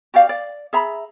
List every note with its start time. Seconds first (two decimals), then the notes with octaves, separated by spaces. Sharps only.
0.14 F#4 G4 D5 F5
0.29 D5
0.73 G#4 E5 A#5 B5